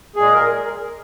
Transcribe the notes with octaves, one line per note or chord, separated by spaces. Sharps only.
A#2 G#3 G#4
A#4